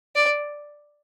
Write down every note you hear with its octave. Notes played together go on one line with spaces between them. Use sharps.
D5